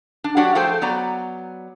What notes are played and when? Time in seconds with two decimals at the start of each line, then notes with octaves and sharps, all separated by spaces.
0.24 D4
0.37 F#3 D4 F#4 G4 D5 F#5
0.55 F3 A3 G#4 A4 C5 G5
0.82 F#3 B3 D5 A#5